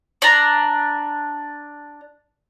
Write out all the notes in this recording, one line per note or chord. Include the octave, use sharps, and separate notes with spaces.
D4 A#5